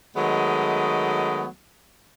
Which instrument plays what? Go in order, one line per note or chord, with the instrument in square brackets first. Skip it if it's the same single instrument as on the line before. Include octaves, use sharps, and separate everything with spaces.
[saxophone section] D#3 F#3 G#3 A3 B3